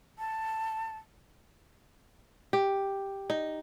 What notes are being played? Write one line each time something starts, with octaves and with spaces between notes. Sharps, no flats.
A5
G4
D#4